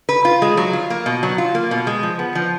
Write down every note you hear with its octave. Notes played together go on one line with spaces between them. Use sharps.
B4
F4
G#3
F#3
F4
A#3
B2
F#3
F4
A#3
B2
G#3
F3
B3
F3